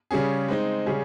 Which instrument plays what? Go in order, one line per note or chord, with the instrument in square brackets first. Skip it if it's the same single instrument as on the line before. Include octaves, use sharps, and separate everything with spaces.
[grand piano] C#3 G3 C#4 G#4
G#3 C4 D#4
C#3 G3 C#4 G#4